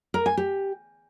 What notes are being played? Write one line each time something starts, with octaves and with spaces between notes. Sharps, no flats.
A#4
G#5
G4